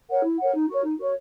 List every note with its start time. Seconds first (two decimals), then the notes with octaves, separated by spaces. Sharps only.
0.09 A#4 C#5 F#5
0.23 E4
0.39 A#4 C#5 F#5
0.53 D#4
0.68 F#4 A#4 C#5
0.84 D#4
0.98 F#4 A#4 C#5